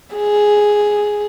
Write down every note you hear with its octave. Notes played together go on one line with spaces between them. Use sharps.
G#4